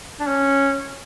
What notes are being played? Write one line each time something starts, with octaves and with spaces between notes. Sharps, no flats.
D4
C#4